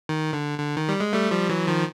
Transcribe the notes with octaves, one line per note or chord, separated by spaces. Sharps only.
D#3
D3
D3
D#3
G3
G#3
G3 A3
F3 G3
E3 F#3
D#3 F3